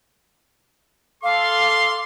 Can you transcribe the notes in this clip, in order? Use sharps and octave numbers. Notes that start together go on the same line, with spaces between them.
A4 F5 C6 D6